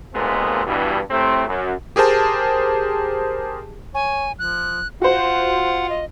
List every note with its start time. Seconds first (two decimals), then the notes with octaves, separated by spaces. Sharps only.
0.12 D#2 A#2 G#3 A3 B3 C4
0.65 G2 B2 E3
1.09 A2 C3 A3 C4
1.46 F#2
1.96 G4 G#4 A#4 C5 A5
3.94 C#5 G#5
4.39 F3 F#6
5.01 F4 F#4 C5 F#5
5.89 D#5